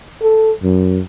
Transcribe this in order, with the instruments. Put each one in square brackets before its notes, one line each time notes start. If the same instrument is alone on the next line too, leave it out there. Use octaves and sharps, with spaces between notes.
[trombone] A4
F#2